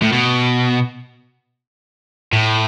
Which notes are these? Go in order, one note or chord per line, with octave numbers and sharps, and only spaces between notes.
A2
B2
A2